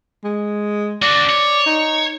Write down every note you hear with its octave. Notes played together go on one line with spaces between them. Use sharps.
G#3
D4 F#4 D5
C#5
D#4